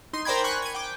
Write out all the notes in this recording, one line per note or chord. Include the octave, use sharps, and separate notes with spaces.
D#4 C6
A#4 C5 D5 G5 B5 G#6
G#5 B5 C#6 F#6
G#6 D#7
G5 D6